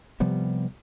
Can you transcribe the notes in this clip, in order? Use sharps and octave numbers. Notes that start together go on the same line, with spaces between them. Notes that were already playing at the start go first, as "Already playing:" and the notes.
C3 F3 G3 B3